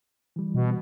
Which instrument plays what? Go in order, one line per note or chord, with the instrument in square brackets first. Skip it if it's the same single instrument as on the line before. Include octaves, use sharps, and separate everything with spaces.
[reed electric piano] E3 G3
[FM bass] B2